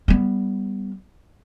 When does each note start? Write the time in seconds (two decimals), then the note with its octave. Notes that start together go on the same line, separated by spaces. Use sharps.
0.08 G3 B3